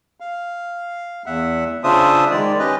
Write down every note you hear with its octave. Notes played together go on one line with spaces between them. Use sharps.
F5
E2 E5 F#5
C#3 D4 F4 C5 E5 D#6
D#3 G#3 D5
C#4 G4 B4 D#5